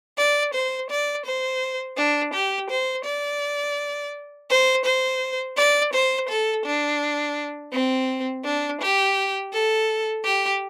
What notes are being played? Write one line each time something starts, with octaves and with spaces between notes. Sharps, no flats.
D5
C5
D5
C5
D4
G4
C5
D5
C5
C5
D5
C5
A4
D4
C4
D4
G4
A4
G4